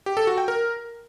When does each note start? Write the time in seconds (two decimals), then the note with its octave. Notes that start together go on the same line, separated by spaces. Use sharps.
0.06 G4
0.17 A4
0.27 F#4
0.38 G5
0.48 A#4